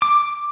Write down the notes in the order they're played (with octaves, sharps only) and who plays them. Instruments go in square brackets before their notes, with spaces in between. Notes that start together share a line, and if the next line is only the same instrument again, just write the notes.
[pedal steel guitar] D6